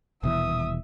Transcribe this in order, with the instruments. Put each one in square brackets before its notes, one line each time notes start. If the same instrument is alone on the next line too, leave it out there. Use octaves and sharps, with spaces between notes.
[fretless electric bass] D#1 B2 E3 [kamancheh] E5 D#6